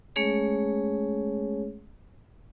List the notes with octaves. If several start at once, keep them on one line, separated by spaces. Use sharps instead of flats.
G#3 A3 C#4 G#4 C#5